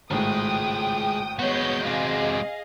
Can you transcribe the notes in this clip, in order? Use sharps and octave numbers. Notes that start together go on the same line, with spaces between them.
G#1 C#2 A2 G#3 G5 D#6
G#3 B3 F#4 C#5 G6
C3 G#4 D#5 F5